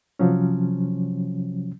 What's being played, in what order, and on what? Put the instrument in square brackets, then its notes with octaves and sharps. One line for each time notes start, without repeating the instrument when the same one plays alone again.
[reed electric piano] C3 F3 F#3 C#4